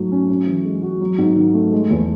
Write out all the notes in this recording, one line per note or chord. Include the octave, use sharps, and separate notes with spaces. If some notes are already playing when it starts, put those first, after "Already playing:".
Already playing: G#2 F#3 A3
C#4
C#4
E3
G#3
F#4
F#3
G#2
D#3
A3
G#3
E2